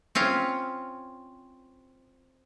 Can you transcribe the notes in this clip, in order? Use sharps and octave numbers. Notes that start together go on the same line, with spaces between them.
C4 C#4 F4 F5